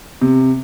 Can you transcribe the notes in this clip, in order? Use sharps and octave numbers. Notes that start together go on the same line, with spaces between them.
C3